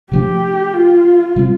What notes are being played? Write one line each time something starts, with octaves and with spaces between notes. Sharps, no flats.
C3 F3 A3 D4 G4
F4
C3 G3 C4